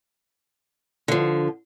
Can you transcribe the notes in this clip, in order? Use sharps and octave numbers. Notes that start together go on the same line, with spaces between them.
D3 F3